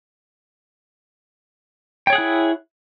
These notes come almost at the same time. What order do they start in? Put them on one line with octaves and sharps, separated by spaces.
G5 C#5 G#4 F#5 E4